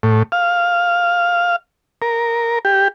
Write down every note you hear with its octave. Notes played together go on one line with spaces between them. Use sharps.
A2
F5
A#4
G4